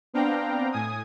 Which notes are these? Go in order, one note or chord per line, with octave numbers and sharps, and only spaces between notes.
B3 C4 D4 F5 G5 A#5
A2 G#5 D#6